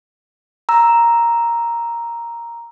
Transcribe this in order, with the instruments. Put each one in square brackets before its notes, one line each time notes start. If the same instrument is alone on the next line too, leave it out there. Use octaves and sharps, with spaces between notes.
[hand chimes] A#5 E6